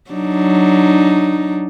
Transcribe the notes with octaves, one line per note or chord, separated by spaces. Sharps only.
F#3 D4 D#4